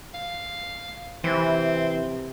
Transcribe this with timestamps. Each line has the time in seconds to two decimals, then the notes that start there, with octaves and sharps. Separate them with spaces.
0.14 F5
1.24 C3 E3 C4